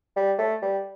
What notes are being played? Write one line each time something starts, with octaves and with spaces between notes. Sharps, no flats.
G3
A3
G3